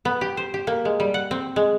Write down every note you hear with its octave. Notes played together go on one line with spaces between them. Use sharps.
B3
G4
C5
G4
A#3
G#3
G3
F#5
C4
G#3